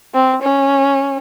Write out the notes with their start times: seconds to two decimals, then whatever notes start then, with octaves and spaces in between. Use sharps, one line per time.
0.14 C4
0.42 C#4